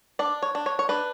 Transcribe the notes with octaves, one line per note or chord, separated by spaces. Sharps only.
D4 D5
C#5
D4
C#5
C#5
D4 B4